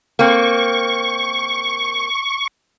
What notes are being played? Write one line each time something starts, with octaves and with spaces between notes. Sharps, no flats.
A#3 C4 C#6